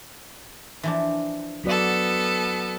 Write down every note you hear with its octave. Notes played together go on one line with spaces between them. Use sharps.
E3 F3 D4
F#3 B3 F#4 A4 D5